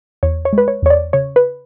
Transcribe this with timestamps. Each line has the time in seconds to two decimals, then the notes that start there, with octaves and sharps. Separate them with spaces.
0.23 E2 C#5
0.45 C#5
0.53 G#3
0.58 B4
0.68 C#5
0.82 E2 C#5
0.90 D5
1.13 C#3 C#5
1.36 B4